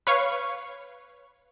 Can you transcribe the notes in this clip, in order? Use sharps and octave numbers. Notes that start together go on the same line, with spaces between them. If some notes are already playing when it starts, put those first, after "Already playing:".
B4 C#5 F5 C#6